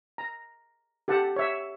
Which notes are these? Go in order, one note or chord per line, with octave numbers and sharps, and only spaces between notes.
A#5
G4 A4 F#5 A5
C#5 E5